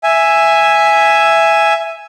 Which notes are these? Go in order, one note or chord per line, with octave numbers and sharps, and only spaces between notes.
E5 G#5